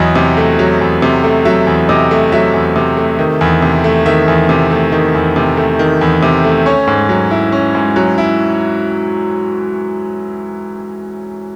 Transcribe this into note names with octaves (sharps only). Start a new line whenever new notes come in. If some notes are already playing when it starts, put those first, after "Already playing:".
Already playing: E2 F#3 D#5
C3
A3
F#3
E2
C3
A3
F#3 E5
E2
C3 D#5
A3
F#3 E5
E2
C3
A3
D#3
E2
C3
A3
D#3 E5
E2
C3
A3
D#3
E2
C3
A3
D#3
E2
C3
A3
C#4 C#5
G#2
F#3
E4
C#4
G#2
F#3
E4